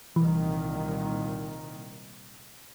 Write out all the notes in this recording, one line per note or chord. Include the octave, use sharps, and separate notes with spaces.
C2 A#2 D#3 E3